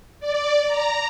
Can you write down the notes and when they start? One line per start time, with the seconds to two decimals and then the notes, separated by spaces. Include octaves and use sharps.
0.20 D5
0.67 A#5